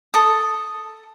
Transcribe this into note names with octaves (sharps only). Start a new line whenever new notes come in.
A4 D#6